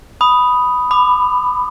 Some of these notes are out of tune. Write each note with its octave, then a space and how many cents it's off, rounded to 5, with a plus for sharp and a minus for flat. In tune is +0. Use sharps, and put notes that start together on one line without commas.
B5 +0 D#6 +0
B5 +15 D6 +35